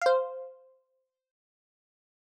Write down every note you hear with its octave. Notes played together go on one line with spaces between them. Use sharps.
C5 F5